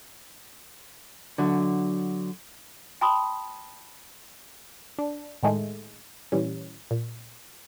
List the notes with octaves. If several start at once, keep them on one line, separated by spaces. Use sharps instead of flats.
D3 F#3
G5 A5 B5 C6 D#6
D4
A2 D#3 G#3 A3
A#2 E3 G3 C#4
A#2